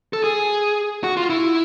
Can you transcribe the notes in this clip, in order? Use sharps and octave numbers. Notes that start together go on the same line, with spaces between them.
A4
G#4
F#4
F4
E4